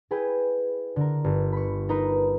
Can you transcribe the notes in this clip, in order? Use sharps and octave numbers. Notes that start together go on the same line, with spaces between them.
E4 G#4 B4 G5
D3 A#4
G1
B5 C#6
D#4 A#4 B4